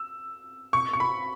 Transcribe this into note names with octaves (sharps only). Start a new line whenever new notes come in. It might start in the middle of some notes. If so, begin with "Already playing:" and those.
Already playing: E6
C#6
C#6
B5